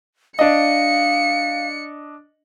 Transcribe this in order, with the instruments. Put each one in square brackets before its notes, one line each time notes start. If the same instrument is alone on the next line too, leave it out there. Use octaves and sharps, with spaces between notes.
[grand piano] D4 D#5 [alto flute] F5 [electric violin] C#7